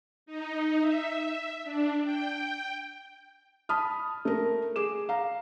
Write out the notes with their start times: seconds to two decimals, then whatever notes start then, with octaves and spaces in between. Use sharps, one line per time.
0.26 D#4
0.81 E5
1.64 D4
2.04 G5
3.69 A5 B5 D#6 F6
4.25 A3 A#4
4.76 G#4 D6 E7
5.09 F5 A#5